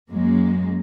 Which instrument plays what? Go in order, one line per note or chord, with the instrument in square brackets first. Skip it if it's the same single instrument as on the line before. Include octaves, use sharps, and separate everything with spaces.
[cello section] F#2 G#3 A#3